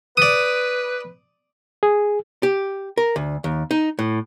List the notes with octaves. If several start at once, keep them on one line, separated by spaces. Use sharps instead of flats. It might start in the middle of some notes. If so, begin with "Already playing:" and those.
B4 D5 D#6
G#4
G4
A#4
D2
D#2
D#4
A2